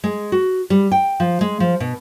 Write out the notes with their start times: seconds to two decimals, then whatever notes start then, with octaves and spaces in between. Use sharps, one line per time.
0.04 G#3
0.32 F#4
0.70 G3
0.92 G5
1.20 F3
1.41 G#3
1.60 F3
1.80 B2